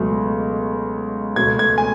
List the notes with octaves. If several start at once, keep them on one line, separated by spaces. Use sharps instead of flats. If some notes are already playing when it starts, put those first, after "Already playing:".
Already playing: C#2 B2 F#3 A3
C#2 B2 A3 G#6
G#6
G#5